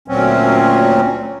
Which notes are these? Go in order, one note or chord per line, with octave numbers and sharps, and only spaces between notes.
D2 A#2 F#3 C4 C#4